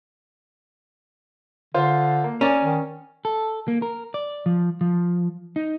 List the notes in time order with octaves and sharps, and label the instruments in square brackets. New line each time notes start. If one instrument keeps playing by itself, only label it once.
[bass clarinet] D3 [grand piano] F4 C5
[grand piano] A#3
[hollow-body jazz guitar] C#4 [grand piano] A#4 D5 G#5
[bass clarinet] D#3
[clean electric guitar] A4
A#3
A#4
D5
F3
F3
D#4